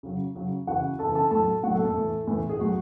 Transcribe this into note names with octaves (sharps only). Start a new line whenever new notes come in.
C#3 F#3
C#3 F#3
C#3 E3 F#4 F#5
C#3 E3 A4 A5
A4 A5
A2 F#3 A4 A5
A2 F#3 F#4 F#5
A3 A4
A3 A4
A2 E3
A2 E3
G#4
A2 F#3 F#4